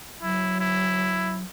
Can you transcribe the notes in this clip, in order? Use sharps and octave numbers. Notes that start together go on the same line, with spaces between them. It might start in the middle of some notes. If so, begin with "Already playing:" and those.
F#3 E4
E4